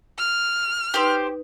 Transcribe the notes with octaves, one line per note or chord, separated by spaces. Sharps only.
F6
D#4 G4 B4 C5